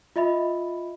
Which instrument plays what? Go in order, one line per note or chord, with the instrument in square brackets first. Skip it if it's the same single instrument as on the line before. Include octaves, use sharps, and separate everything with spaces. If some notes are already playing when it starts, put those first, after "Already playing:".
[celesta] F4 D#5 E5 B5